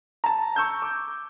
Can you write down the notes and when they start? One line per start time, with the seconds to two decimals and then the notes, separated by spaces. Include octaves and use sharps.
0.24 A5 A#5
0.56 C#6 E6 G6
0.82 D6